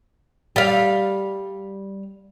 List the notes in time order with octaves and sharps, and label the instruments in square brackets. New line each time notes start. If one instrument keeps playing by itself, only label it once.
[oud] G3 F5